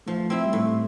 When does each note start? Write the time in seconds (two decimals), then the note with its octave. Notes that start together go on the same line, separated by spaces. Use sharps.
0.07 F3 A3
0.30 C4 E4
0.45 G3
0.53 A2 A3